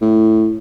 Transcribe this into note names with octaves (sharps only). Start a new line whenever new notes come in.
A2